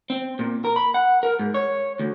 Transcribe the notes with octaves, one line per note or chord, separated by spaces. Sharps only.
C4
A#2
A#4
B5
F#5
A#4
G#2
C#5
D2